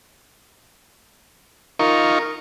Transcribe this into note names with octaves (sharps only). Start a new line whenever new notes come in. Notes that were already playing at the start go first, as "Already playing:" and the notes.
D#4 F4 A#4 C#6